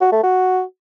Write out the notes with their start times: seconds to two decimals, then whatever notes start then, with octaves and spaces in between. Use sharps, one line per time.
0.01 F#4
0.12 A3
0.23 F#4